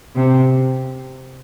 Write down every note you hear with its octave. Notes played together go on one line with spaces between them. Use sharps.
C3